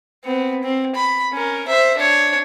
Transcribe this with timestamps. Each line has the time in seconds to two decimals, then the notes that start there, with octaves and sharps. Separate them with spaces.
0.25 B3 C4
0.63 C4
0.95 B5
1.32 C#4 A#4
1.68 C5 E5
1.97 D4 C#5